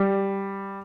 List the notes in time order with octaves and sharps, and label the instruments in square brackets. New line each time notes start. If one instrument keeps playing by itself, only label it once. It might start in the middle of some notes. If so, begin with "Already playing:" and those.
Already playing: [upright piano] G3